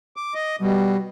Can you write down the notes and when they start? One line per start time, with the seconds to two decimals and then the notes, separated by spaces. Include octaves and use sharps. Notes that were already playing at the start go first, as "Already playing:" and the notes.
0.16 D6
0.34 D#5
0.60 B2 G3